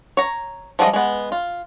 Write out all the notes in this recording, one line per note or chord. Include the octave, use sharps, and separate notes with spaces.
C#5 A#5
F3 G3 G#3 G#4 D#5
G#3 B3
F4